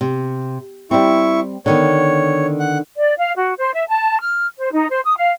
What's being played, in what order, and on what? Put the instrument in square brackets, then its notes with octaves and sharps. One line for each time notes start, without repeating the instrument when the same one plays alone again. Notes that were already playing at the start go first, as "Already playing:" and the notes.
[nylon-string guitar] C3
[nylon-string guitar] G3 C4 [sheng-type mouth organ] E4 C#6
[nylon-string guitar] D3 D#3 B3 [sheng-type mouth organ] C#5
[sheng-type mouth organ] F#5
[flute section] D5
F5
F#4
C5
E5
A5
F6
C5
D#4
C5
D#6
F5